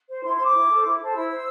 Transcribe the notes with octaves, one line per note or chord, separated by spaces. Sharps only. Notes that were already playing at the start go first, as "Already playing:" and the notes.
C5
E4 C6
C6
C5 D6
E4
A4 C5
E4
A4 C5
E4 E6
C5